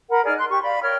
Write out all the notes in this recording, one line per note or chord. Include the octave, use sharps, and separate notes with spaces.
A#4 F#5 B5
D#4 G#4 D5 F6
C6 F#6
G4 C#6
D5 F5 G5 B5
A#4 C#5 G5 F6